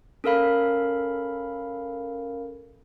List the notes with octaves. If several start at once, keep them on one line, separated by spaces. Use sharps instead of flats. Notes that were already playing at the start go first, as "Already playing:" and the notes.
C#4 A4 A#4 F5 B5